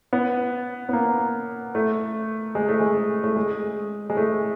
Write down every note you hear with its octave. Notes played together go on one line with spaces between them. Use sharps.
B3
B3
A#3
A3
G#3
A3
G#3
A3
G#3
G#3
A3